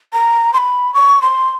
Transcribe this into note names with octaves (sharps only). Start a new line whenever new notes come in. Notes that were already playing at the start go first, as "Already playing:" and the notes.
A#5
C6
B5
C#6
C6